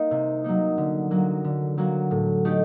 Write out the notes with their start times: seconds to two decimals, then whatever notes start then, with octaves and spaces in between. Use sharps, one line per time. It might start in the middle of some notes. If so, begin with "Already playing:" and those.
Already playing: A#3 D#4
0.11 C3
0.44 F#3 A#3 D#4
0.78 D3
1.11 F#3 A#3 F#4
1.44 D3
1.78 F#3 A#3 F#4
2.11 A2
2.45 A3 D#4 G4